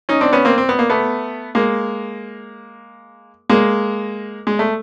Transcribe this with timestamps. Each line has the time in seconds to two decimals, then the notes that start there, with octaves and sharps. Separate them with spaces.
0.09 C#4 D#4
0.21 C4 D4
0.33 B3 C#4
0.45 A#3 C4
0.58 C4
0.69 B3
0.79 A#3
0.90 A3 B3
1.55 G#3 A#3
3.50 G#3 A#3
4.47 G#3
4.59 A3